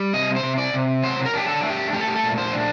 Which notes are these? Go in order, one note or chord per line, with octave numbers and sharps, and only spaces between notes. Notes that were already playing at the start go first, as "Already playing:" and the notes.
Already playing: G3
C3 D#5
C5
C3
D5
C3
F#3 C5
A#4
D4 G4
A4
A3
G4
A3 G4
A4
G4
A4
A#2
C5
D4